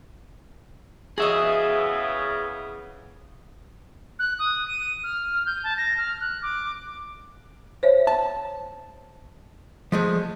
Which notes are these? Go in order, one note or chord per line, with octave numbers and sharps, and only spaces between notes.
C#3 E3 B3 F#4 G#4 D#5 E5
F#6
D#6
D#7
F6
G6
A5
A#6
F6
F#6
D6
C5 C#5 E5
A5
F3 G#3 A3